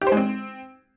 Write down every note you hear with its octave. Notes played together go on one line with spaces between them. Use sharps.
G4
C5
G#3
C4